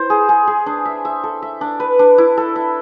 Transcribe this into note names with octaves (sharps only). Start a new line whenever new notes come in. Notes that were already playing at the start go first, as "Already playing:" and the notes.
Already playing: E4 C5
G#4
G#4
G#4
D4
E5
E5
A4
E5
D4
B4
D4
E4
A4
E5